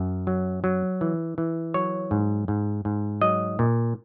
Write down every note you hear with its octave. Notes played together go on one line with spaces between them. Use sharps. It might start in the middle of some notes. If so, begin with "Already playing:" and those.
Already playing: F#2
F#3
F#3
E3
E3
F#3 C#5
G#2
G#2
G#2
F#3 D#5
A#2